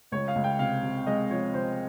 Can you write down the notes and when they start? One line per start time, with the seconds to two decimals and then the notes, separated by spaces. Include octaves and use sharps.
0.12 C#2 C#5
0.28 F5
0.35 C#2
0.44 G5
0.59 C3 F5
0.83 C3
1.07 G#3 D#5
1.30 F3 C#5
1.54 C3 C5